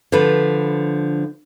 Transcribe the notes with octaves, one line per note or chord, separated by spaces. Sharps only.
D3 F3 B4